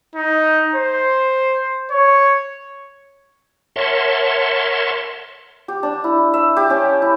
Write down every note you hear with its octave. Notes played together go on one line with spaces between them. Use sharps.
D#4
C5
C#5
A#4 C#5 E5 F#5 A5 C6
G4
D4
E4
E5
G4
C#4
E4